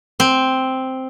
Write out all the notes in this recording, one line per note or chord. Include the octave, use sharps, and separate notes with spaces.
C4